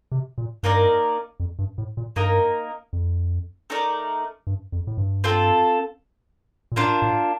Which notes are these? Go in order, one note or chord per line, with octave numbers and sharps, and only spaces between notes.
C3
A#2
G2 A#3 D#4 A#4 D5
F2
G2
A2
A#2
G2 A#3 D#4 A#4 D#5
F2
A3 D#4 A#4 D5
G2
F2
A2
G2
C4 F4 A4
A#2
A2 A#3 D4 F4 C5
A2